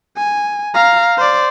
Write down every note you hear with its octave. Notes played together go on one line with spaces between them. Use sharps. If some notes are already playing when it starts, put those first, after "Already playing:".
G#5
F5 A#5
C5 D5